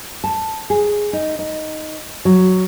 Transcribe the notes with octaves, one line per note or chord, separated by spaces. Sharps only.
A5
G#4
D#4
D#4
F#3